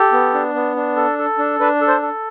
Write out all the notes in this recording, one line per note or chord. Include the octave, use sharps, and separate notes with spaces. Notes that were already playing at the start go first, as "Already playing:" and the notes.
Already playing: G4 A4
B3
D4
B3
D4
A4
A4
D4
D4 B4
A4
C5
A4